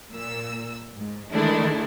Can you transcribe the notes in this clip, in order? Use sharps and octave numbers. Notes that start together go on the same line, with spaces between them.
A#2 E6
G#2
D#3 E3 G#3 A3 D4 E4